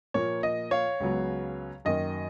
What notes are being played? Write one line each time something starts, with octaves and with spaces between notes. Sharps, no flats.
A#2 F3 A#3 C#5
D#5
C#5 F5
C#2 C#3 F#3 B3
F#2 D#3 A#3 D#5